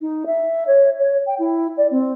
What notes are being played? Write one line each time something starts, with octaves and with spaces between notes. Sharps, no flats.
D#4
E5
C#5
C#5
G5
E4
D5
C4